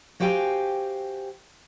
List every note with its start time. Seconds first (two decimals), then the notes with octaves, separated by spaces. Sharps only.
0.20 F#4 G4 C5 F5 G5 G#5